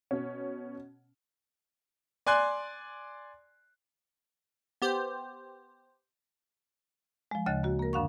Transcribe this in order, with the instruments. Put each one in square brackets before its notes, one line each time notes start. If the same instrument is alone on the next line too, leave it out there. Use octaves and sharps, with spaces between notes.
[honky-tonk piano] B2 C#4
[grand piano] D5 G#5 C6 F#6
[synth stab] B3 G4 C5
[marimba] F3 G#3
D2 C#3 D#5 F#6 A6
A#3 F#4
A#3 A#4
F#2 D3 D4 F5 F#5 C#6